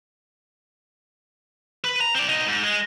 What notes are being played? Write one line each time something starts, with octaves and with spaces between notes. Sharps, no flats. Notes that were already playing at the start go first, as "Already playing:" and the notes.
B4
A#5
C4 D5
B2 D#4
G#2
G#3